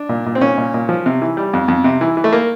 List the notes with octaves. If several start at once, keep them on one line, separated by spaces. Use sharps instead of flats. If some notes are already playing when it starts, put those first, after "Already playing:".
Already playing: D4
A#2
A#2
C4
A#2 C#4
A#2
A#2
F3
C3
E3
G3
F2
F2
C3
E3
E3
A3
A#3